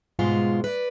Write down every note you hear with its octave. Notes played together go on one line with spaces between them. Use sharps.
G#2 B2 G#3 F4
B4 D5